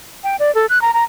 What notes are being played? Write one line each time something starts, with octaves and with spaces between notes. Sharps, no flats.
G5
D5
A4
F#6
A#5
A#5